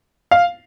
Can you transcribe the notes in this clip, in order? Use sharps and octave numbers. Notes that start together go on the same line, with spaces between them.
F5